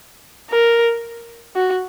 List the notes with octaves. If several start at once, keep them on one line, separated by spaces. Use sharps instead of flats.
A#4
F#4